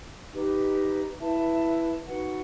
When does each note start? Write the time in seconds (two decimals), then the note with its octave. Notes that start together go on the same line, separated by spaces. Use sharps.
0.32 D#4 G4 B4
1.19 E4 B4 E5 A5
2.05 D#4 F#4 B4 F#5